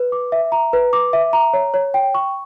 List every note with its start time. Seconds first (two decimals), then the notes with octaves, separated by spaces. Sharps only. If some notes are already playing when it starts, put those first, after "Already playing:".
Already playing: B4
0.12 D6
0.32 E5
0.52 A#5
0.73 B4
0.93 D6
1.13 E5
1.33 A#5
1.53 C#5
1.74 C#5
1.94 G5
2.15 C#6